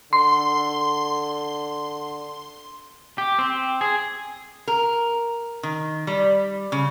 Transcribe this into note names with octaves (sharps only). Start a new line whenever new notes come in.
D3 C6
G4
C4
G#4
A#4
D#3
G3
C#3